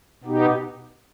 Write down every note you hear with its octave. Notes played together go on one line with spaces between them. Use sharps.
B2 B3 D#4 G4